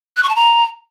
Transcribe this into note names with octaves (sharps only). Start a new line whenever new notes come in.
F#6
C#6
A5
A#5